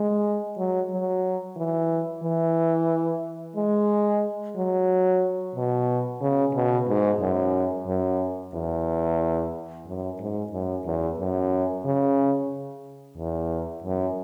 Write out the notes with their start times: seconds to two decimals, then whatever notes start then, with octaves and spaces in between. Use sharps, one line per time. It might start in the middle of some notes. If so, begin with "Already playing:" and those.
Already playing: G#3
0.58 F#3
0.91 F#3
1.56 E3
2.23 E3
3.56 G#3
4.56 F#3
5.56 B2
6.21 C#3
6.54 B2
6.88 G#2
7.20 F#2
7.87 F#2
8.54 E2
9.86 F#2
10.20 G#2
10.53 F#2
10.85 E2
11.18 F#2
11.85 C#3
13.17 E2
13.84 F#2